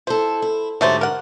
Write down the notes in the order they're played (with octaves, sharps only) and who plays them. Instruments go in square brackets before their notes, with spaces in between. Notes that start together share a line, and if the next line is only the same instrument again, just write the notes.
[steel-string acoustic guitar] E4 A4 [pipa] C5
[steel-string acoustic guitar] E4
[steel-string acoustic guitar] G#2 D3 G4 [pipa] F#3 A3 C5
[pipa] A#4 F#5